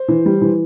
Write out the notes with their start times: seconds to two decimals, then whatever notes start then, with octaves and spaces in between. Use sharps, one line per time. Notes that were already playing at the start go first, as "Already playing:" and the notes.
Already playing: C5
0.08 E3
0.26 G3
0.42 E3